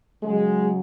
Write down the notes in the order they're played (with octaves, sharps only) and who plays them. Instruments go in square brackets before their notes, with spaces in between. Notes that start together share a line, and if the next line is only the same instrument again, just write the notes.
[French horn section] C#3 F#3 G#3